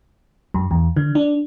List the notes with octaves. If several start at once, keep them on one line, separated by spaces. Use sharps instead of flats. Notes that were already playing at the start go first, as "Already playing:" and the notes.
F#2
E2
D3
D4